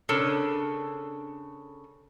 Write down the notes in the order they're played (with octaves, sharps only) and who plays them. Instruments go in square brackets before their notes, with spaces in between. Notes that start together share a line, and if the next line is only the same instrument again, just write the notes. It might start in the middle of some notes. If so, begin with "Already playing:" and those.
[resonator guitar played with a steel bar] C#3 D4 A4 A#4